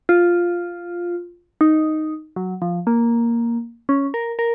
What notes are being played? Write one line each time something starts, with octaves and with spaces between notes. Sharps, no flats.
F4
D#4
F#3
F3
A#3
C#4
A#4
A#4